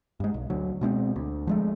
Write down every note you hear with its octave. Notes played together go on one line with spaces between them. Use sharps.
G2 G#3
B1
D2 F#3
B2 G#3 B3 C4
D2
F3 G#3 A3